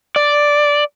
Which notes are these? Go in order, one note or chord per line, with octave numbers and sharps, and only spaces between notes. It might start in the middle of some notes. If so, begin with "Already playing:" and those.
D5